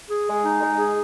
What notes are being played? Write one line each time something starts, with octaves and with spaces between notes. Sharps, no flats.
G#4
G#3
D#4
G#3
G#4